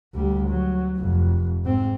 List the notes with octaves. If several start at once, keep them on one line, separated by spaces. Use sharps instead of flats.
D2 G3
F#3
F1 F2
G#2 C4